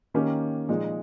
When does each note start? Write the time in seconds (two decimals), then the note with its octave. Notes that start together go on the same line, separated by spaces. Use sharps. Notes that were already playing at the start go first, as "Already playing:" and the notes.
0.14 D#3 A#3 C#4 G4
0.69 A#2 F3 G#3 D#4